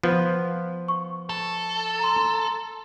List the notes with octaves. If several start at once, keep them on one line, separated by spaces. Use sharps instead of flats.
F3 B3
C#6
A4
A#5 C6